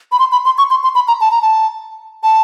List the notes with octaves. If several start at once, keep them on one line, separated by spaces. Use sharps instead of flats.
B5
C6
B5
C6
C#6
C6
C6
B5
A#5
A5
A#5
A5
A5